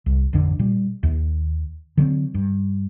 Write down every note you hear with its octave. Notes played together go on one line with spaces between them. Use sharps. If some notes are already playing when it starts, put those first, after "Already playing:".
C2
A1 F2 D3 D4
A#2 G3
D#2
D3 F#3 A3 C4
G2